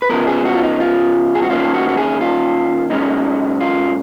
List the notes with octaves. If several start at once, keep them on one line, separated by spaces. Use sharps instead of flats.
B4
C#3 F3 B3 A#4
G#4
F#4
F4
D#4
F4
G#4
F#4
D#3 A#3 C#4 F4
F#4
F#4
G#4
F4
A#2 G#3 C#4 D#4
F4